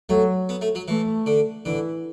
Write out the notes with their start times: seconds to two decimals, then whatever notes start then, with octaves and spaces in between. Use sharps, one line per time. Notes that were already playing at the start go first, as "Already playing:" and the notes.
0.09 F#3 A3
0.49 B3
0.61 A3
0.75 F#3
0.88 E3 A3
1.26 D3
1.65 D3 E3